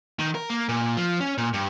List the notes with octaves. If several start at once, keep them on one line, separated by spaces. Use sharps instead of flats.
D#3
A#4
A#3
A#2
F3
C#4
A#2
G2